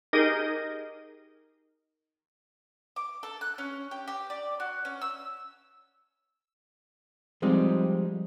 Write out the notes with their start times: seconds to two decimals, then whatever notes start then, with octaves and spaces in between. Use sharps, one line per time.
0.13 D#4 G4 G#4 A#4 D#5
2.96 D6
3.23 A4
3.41 F#6
3.58 C#4
3.91 G4
4.08 G4
4.30 D5
4.60 F#4
4.85 C#4
5.01 E6
7.42 F3 G3 G#3 C4 D#4